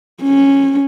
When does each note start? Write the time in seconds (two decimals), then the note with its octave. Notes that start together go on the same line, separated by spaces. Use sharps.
0.22 C#4